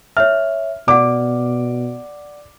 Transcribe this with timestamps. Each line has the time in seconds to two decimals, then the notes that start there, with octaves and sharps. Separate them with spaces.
0.17 C#5 E5 F6
0.88 B2 D5 F#5 D6